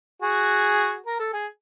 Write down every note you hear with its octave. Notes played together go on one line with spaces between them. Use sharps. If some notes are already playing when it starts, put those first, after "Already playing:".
F#4 G#4
A#4
A4
G#4